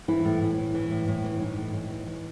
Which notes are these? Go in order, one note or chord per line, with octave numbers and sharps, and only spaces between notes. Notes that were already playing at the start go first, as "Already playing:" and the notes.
E3 E4
A2
A2
E3
E3
A2
A2
E3
E3 D#4
A2
A2
E3
E3